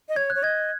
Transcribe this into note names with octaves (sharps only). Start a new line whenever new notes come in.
D#5
C#5 G#6
F#6
C#5
D#5 G#6